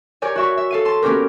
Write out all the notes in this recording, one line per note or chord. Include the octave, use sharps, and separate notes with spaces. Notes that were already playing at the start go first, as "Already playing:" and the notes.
G4 A#4 C#5 D5 G#5
F#4 E5 C#6
E5
A4 F5 D#7
A5 C6
A#3 B3 C#4 F#4 G4 A#4